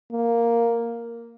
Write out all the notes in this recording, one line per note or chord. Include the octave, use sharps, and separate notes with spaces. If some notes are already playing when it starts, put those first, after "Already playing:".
A#3